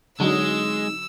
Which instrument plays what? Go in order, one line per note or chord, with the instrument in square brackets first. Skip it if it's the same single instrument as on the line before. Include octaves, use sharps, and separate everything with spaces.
[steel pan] D3 F#3 [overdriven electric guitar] G#3 [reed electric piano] C4 D#4 [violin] E6